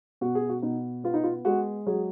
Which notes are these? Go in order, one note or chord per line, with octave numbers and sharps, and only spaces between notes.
B2 F#4
G#4
F#4
B2 D#4
B3 F4
D#4
F4
G#3 F#4
F#3 G#4